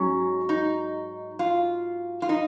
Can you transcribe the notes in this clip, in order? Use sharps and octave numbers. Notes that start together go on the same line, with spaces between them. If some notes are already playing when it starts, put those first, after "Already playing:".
Already playing: G#2 F#3 C#4
D#4
F4
F4
D#4